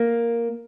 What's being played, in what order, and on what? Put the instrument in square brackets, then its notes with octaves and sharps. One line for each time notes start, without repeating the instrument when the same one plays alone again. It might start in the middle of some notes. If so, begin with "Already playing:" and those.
Already playing: [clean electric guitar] A#3